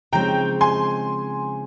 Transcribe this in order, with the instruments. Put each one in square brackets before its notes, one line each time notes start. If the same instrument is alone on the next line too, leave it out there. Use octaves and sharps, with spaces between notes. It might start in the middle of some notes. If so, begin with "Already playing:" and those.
[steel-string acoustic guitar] C#3 F3 G#3 C4 D#4 [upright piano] G5 A#5
[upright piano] G#5 C6